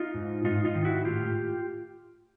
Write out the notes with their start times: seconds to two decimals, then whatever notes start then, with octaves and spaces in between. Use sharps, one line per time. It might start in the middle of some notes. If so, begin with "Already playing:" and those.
Already playing: D#4 F4
0.14 G#2
0.45 G#2 D#4 F4
0.65 D#4 F4
0.75 D#3
0.85 E4 F#4
1.05 A2 F4 G4